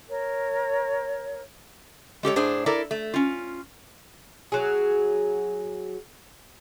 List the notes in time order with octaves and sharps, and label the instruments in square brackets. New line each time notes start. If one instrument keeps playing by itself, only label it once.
[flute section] A#4 C#5
[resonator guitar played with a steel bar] G#3 G4 A4 C#5
A2 D4 G#4 C5
E4 A4 A#4 D5
A3
C#4 F4
[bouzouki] F#3 G#4